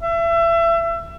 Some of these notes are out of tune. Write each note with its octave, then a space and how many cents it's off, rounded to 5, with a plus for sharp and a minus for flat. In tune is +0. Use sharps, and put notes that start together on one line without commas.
E5 +30